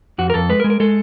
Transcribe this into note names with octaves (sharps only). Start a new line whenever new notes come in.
F2 F#4
A#4
F2 A4
G#3 B4
A#4
G#3
A#4
G#3 A4